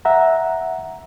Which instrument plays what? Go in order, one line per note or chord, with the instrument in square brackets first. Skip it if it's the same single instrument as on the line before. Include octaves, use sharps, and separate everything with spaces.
[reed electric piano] E5 F#5 A#5